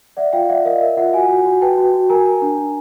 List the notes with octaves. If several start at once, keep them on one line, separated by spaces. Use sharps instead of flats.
D5 E5 F#5
F4 F5 G5
D5 E5 F#5
A#4 D#5 F5
A#4 E5
F4 E5 F#5
F#4 F#5 G#5
F#4
F#4
B4 G5 A5
F#4
F#4
A#4 G#5 A#5
A#4
D4
D4